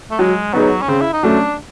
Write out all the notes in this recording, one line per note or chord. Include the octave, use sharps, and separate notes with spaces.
A3
F#3 G#3
F#3 B3 D#4 G#4 C#5
C#4
C#3 C4
E4
D#4
F#3 A3 C#4 D4